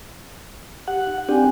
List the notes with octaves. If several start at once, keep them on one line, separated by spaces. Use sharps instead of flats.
G4 F#5
D#4
C4 D4 G4 G5 G#5